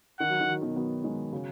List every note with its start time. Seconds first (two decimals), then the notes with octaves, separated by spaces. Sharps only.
0.20 D#3 F#5
0.30 F#3
0.41 D#3
0.51 F#3
0.61 B2 D#3
0.76 F#3 B3
1.04 D#3 G#3
1.32 C#3 F#3